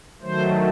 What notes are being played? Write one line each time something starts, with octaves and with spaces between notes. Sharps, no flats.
D#3 F#3 A3 C5